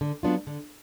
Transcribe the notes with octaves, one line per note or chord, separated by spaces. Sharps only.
D3
F#3 B3 D4 F4
D3